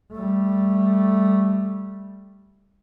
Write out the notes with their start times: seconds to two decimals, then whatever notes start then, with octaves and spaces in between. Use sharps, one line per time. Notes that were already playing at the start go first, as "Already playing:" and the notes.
0.12 G3 A3